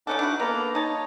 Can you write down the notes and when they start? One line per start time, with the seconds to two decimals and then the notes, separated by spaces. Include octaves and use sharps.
0.07 C#3 C#4 D#4 A4 F#5 D6
0.19 D4 E4 F#4
0.40 A#3 B3 A4 A#5
0.75 D#4 C#5 D#5 A5